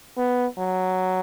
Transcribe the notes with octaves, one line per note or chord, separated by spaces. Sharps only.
B3
F#3